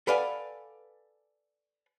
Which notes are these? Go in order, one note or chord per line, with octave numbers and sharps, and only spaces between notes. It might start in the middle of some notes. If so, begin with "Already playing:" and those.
A4 B4 D5 F5 F#5 G#5